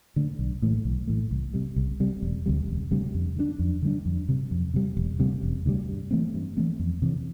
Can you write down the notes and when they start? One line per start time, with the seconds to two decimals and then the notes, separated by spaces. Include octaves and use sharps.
0.16 D3 A3
0.39 B1
0.62 A2 E3 A3
0.85 B1
1.07 A2 E3 A3
1.31 C2
1.54 C3 G3
1.76 C2
2.00 C3 G3
2.22 E1
2.46 D2 C3 G3
2.68 E1
2.91 D2 C3 G3
3.14 F2
3.36 D3 G3 D4
3.59 F2
3.82 D3 G3 D4
4.06 F2
4.29 C3 G3
4.51 F2
4.74 C3 G3
4.97 E1
5.19 D2 C3 G3
5.43 E1
5.66 D2 C3 G3
5.89 G2
6.11 E3 A3 C4
6.34 G2
6.57 E3 A3 C4
6.79 F2
7.02 C3 E3